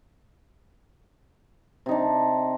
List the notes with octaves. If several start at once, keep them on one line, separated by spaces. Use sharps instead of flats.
C3 D4 D#4